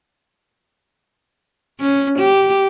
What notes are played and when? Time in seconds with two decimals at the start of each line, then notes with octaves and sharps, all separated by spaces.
1.81 C#4
2.19 G4